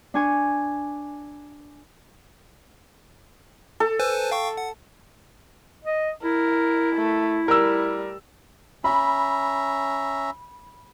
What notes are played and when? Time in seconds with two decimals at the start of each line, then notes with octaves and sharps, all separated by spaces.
0.14 D4 G#5 C#6
3.80 A4
3.99 B4 C5 G#5
4.31 F5 G5 C#6
4.58 F#5
5.85 D#5
6.23 E4 A#4
6.96 A3
7.48 G3 A#4 E6
8.84 C#4 E5 A#5 B5